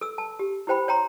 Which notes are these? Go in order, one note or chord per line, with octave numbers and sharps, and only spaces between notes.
A4 E6
A5
G4
E4 G4 C5 G5 B5
C#5 G5 A#5 C6